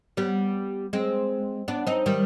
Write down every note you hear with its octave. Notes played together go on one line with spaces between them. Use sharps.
G3 B3
G#3 C4
B3 D4
C4 D#4
D#3 G3